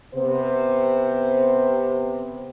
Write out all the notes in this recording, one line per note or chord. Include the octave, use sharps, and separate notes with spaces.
C3 B3 C5